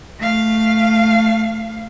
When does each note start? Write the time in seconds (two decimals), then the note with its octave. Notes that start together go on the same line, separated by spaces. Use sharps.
0.19 A3 F5